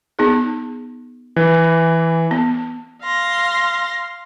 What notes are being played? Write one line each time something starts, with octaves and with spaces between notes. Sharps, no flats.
B3 D#4 G#4
E3
B3
F5 C6 A#6